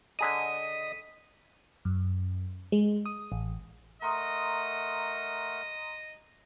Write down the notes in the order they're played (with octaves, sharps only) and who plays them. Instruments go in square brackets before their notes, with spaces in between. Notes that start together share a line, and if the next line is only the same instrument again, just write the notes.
[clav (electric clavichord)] D3 G#4 A#5 [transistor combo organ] D#5 [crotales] B6 D#7
[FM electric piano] F#2
G#3
D#6
A1
[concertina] A3 A#4 F#5 [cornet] D#5 [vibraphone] A#5 C6 D#6